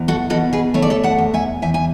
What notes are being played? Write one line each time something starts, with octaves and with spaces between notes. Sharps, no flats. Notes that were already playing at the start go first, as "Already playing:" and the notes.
Already playing: E2
F#4 A4
B2 F#4 A4
G#4 B4
A3 C#5
D5
A4 C#5
F#5 A5
E2
E5 G#5
E2 E5 G#5
G#5